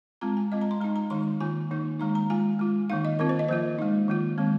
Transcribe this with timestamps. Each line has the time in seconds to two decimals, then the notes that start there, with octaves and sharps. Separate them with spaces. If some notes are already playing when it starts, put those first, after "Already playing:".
0.21 G#3 C4 F4 A#5
0.37 G#5
0.52 G#3 C4 F4 D#5
0.61 A#5
0.71 C6
0.81 G#3 D#4 A#5
0.96 A#5
1.10 D#3 G#3 D#4 C6
1.41 D#3 A#3 F4 G#5
1.71 D#3 A#3 D#4
2.00 D#3 G#3 D#4 A#5
2.15 A#5
2.30 G#3 F4 G#5
2.59 G#3 F4
2.90 D#3 A#3 D#4 F5
3.05 D#5
3.19 D#3 C4 F4 A#4
3.29 C5
3.39 D#5
3.49 F3 A#3 F4 C5
3.79 G#3 D#4
4.08 D#3 A#3 F4
4.38 D#3 G#3 C4